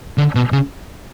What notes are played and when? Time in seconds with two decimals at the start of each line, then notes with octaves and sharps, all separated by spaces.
0.18 D3
0.35 B2
0.52 C#3